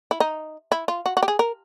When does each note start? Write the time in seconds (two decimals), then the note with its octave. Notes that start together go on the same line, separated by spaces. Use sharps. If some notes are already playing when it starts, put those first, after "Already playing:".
0.11 E4
0.20 D#4
0.72 E4
0.88 F4
1.06 F#4
1.17 F#4
1.23 G4
1.28 G#4
1.39 A#4